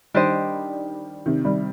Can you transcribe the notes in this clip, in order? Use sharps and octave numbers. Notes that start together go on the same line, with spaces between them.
D#3 G3 D4 G4 C5 D#5
C3 D#3
D#3 G3